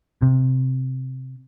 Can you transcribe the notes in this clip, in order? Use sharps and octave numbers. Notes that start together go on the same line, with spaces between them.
C3